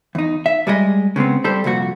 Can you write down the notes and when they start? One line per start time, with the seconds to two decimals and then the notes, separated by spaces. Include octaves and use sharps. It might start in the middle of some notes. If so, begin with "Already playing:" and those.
0.15 E2 D#4
0.46 E5
0.67 G3 G#3 G#4 A#4 D#5
1.16 C#3 G#3 B3 C4
1.44 G3 A4 C5
1.64 C2 F2 A#2 F#4